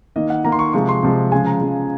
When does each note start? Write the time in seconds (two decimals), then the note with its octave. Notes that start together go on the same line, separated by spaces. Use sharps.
0.16 D#3 A#3 D#5
0.30 F#5
0.44 D#3 A#3 A#5
0.52 C6
0.59 C#6
0.73 C3 F3 G#3 C#6
0.89 C6
1.03 C3 F3 G#3
1.32 C#3 F3 G#3 G#5
1.46 A#5
1.61 C#3 F3 G#3